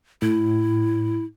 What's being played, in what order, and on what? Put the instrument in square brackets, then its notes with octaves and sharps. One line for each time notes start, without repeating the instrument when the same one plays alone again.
[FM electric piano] A2 [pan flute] E4